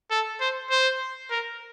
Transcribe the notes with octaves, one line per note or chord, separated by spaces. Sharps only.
A4
C5
C5
A#4